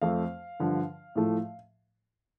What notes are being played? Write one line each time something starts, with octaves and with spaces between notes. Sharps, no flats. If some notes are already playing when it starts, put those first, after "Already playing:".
F2 F3 A3 F5
G2 D3 F3
A2 F3 A3